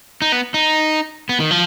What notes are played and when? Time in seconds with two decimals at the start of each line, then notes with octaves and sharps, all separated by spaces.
0.22 D#4
0.32 B3
0.54 D#4
1.29 B3
1.40 D#3
1.51 F3